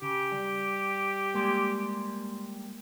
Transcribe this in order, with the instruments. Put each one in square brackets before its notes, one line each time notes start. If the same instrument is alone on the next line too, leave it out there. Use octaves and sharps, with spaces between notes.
[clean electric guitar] C#3 [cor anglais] G4
[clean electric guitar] G3
G3 G#3 A#3